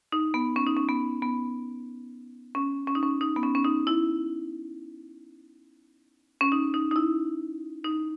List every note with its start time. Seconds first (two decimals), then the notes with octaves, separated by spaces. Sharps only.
0.12 D#4
0.34 B3
0.56 C#4
0.66 D#4
0.77 C#4
0.89 B3
1.22 B3
2.55 C#4
2.87 C#4
2.95 D#4
3.03 C#4
3.21 D#4
3.36 B3
3.43 C#4
3.55 C#4
3.65 D#4
3.87 E4
6.41 C#4
6.52 D#4
6.74 D#4
6.91 D#4
6.96 E4
7.84 D#4